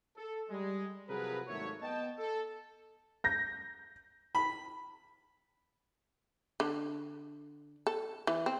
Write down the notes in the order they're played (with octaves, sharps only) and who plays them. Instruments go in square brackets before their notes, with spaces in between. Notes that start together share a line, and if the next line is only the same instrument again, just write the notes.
[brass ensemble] A4
G3 G#3
C3 F3 F#3 G#4 A#4 B4
G#1 F#3 A3 A#3 E4 C#5
B3 D#5 G5 A5
A4
[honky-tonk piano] G6 A#6
[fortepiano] B5
[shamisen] D3
A4
E3
C4